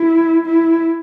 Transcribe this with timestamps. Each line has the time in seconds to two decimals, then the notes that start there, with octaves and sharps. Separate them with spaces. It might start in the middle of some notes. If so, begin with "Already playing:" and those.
Already playing: E4
0.46 E4